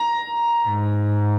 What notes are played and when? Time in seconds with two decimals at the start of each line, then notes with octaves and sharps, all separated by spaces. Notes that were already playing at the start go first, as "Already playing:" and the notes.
Already playing: A#5
0.67 G#2